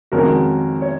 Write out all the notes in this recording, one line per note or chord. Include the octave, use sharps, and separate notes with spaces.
F2 D#3 G#3 C#4 F#4 A#4
C#5